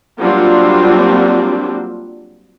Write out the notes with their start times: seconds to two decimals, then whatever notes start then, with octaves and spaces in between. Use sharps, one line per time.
0.19 F#3 G3 A#3 C4 D4 F4